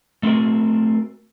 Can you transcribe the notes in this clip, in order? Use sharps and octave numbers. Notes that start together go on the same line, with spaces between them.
A3 C4 F#4 A#4